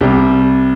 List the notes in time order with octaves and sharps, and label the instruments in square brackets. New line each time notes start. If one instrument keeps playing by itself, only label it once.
[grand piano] C2 C3 G3 C4 G4